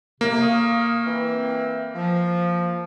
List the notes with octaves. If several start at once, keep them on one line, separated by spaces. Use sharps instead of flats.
A2 C3 A#3
F5 C#6 D#6
E3 C4
F3